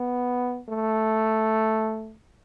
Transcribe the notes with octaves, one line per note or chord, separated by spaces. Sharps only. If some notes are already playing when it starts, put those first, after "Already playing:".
Already playing: B3
A3